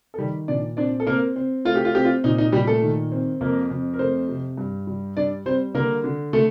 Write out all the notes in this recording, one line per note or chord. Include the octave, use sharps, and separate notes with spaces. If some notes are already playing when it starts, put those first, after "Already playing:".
A4
D#3 G3 G4
A#2 D4 D5
C4 D4 D5
A4
A#3 C4 A#4
C4
A3 F4
G4
F4
C4 G4
F4
A#2 D#4
D#4
A#2 G3 G4
A3 A4
D#3
C4
F2 A#3 A#4
F2
A#4
A3 C4 C5
C3
G2
G3
G3 D4 D5
G3 C4 C5
D3 A#3 A#4
D3
A3 A4